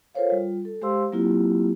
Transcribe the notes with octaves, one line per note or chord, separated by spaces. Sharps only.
F4 A4 A#4 C5 C#5 F5
G3 F4
A4
G#3 G4 C5 F5 C6 E6
F#3 A#3 C4 E4 F4 G4